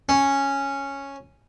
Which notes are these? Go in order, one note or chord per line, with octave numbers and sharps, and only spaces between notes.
C#4